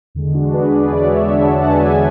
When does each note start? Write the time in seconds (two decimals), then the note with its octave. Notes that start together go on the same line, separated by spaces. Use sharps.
0.15 E2 D3 G#3
0.34 D4 F#4
0.53 G#4 B4
0.72 B4 D5
0.92 E2 D3 G#3 C#5 E5
1.17 C#5 E5
1.42 F#5 A5
1.67 E2 D3 G#3 E5 G#5
1.93 E5 G#5